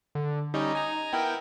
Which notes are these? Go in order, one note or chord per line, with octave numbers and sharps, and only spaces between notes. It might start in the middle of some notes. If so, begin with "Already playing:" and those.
D3
G3 C#4 D#4 G4
G#5 A#5
B3 E4 A#4 G5